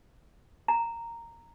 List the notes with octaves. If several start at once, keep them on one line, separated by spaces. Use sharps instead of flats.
A#5